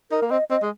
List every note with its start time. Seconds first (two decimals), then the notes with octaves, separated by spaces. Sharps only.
0.11 D#4 A#4
0.22 A#3
0.30 C4 D#5
0.50 C4 D#5
0.62 G#3